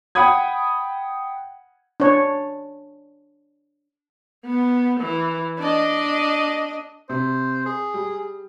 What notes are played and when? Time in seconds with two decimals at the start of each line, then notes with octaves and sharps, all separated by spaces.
0.15 F#5 G5 B5 D#6 G#6
2.00 D4 C#5
4.46 B3
5.01 E3
5.59 D4 D#5
7.09 C3 C5
7.66 G#4
7.94 G3